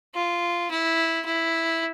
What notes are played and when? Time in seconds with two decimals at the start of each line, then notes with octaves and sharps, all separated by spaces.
0.15 F4
0.70 E4
1.25 E4